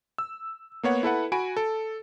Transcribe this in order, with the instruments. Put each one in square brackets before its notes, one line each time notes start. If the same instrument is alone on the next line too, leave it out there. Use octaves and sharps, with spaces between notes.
[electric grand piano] E6
A#3 B3 C#5 F#5
E4 A4 B4 F#5
F#4 G#5 B5 D7
A4